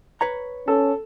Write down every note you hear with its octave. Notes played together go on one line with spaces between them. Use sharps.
B4 C#5 A#5
C#4 A4